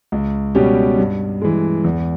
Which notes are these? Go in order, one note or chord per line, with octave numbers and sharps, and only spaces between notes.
C#2
B2 G3 C#4 G4
G2
E3 G#3
E2